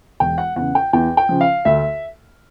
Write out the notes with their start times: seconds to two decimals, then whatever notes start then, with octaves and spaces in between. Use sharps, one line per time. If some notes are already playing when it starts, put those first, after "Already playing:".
0.20 E1 G5
0.38 F#5
0.56 E2 C#3 F#5
0.75 G5
0.93 E2 G5
1.17 G5
1.29 C#3 F3
1.41 F5
1.65 D2 E5